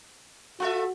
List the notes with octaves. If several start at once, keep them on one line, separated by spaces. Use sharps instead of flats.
F4 F#4 A4 E5